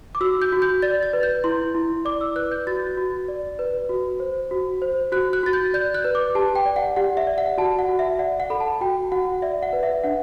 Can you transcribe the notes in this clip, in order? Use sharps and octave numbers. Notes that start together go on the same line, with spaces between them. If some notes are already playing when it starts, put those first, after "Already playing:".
D6
F#4 E6
G6
F#4
G6
D5 A6
A6
B4
G6
E4 C6
E4
D5 D6
E6
B4 F#6
G6
F#4 A6
F#4
D5
B4
F#4
C5
F#4
C5
F#4 F#6
F#6
F#4 A6
G6
D5 G6
F#6
B4
D6
G4 A5
G5
D5
F#5
G4 F#5
E5
D5
F#5
F#4 A5
F#5
F#4
E5
D5 F#5
F#5
A4 B5
A5
F#4 G5
F#4 F#5
D5 E5
F#5
B4
E5
D4 F#5